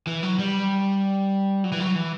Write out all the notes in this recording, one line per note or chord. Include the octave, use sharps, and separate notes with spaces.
E3
F#3
G3
F#3
E3
F#3
E3